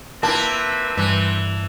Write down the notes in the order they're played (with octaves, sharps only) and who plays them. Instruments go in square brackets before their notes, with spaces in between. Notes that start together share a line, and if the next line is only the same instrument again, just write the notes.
[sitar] A#3 E4 [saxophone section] C4 B4 [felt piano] A5
[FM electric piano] G2 [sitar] E3